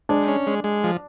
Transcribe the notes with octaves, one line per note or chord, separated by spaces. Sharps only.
G#3 D4
C#4
G#3
G#3
F3